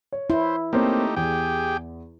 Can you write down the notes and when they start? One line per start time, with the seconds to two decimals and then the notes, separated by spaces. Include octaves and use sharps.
0.12 C#5
0.30 E4 C5
0.73 A3 A#3 C4 D#4 G4 C#5
1.16 E2 G4 G#4 G5